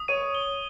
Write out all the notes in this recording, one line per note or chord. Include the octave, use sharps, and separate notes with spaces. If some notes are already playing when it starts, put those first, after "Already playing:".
Already playing: D#6
C#5 D#7
G7